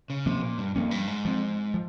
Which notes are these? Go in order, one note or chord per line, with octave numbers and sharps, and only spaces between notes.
C#3
C3 F3 A#3 C#4
A#2
G2
F2 F3 A#3 C#4
G2
G#2
F3 C4
F3